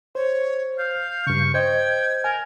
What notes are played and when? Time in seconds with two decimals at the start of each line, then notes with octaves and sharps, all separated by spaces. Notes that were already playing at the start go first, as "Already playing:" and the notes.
0.15 C5 C#5
0.78 F5 G6
1.27 G2 C#3 C#6
1.54 C5 D#5 G5 G#6
2.24 A#4 G#5